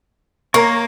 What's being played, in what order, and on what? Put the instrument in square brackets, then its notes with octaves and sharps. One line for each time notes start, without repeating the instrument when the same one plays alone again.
[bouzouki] A#3 [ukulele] A#4 C#5 [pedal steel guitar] A#5 C#6